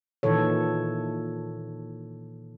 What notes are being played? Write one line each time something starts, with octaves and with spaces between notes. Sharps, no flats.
A#2 D#3 E3 A4 C#5